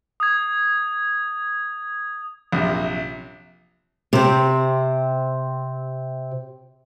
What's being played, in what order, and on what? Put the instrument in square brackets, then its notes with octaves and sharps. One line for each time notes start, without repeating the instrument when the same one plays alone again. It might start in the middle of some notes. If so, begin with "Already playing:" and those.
[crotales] D#6 G#6
[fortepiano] A#1 F#2 C3
[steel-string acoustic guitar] C3 C4